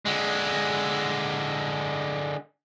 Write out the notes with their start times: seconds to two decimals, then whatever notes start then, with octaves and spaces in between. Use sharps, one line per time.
0.06 D3 G#3